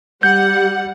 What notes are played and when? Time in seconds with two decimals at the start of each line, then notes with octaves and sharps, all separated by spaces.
0.23 G3 F#5 G6